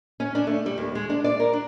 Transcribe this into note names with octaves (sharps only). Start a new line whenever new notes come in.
C#4
D4
A3
G3
D#2
G#3
D4
D5
A#4
D4